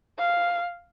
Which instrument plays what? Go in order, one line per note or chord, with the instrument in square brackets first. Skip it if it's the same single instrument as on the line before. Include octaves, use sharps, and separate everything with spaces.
[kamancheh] F5